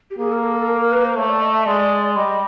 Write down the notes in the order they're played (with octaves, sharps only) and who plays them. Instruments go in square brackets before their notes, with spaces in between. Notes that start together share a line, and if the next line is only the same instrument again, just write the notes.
[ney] G4
[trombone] A#3 [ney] G#4
[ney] A#4
A4
A4
A#4
A#4
B4
C5
[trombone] A3 [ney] C#5
[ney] D5
D#5
E5
[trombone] G#3 [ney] D5
[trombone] G3 [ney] D#5